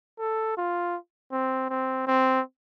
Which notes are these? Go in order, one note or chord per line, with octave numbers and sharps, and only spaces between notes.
A4
F4
C4
C4
C4